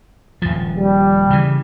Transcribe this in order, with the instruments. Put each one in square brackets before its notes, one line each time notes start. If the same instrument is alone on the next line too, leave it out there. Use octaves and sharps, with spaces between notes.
[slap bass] D#1 F3
[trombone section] G3
[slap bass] C#3 E3